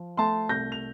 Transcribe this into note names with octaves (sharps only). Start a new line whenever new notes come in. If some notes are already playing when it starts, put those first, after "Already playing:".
Already playing: F3
A3 A5 C6
C2 G6 A#6
F7